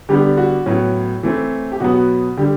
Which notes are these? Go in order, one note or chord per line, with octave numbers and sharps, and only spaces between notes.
D3 G3 B3 G4
F#4
A2 F#3 B3 C#4
E3 A3 C4
G4
B2 F#3 B3 F#4
D3 G3 G4